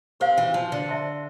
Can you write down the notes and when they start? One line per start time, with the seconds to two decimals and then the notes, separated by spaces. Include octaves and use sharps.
0.20 C4 G4 C5 F5
0.38 E3
0.54 F3
0.72 D3
0.89 C5 E5 A5 C6